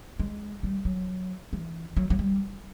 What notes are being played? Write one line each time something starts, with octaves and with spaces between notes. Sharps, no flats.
G#3
G3
F#3
E3
F#3
F#3
G3